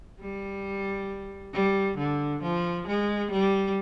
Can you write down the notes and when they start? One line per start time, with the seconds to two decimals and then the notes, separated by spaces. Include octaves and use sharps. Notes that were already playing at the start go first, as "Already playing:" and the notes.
0.20 G3
1.53 G3
1.98 D3
2.43 F3
2.88 G#3
3.32 G3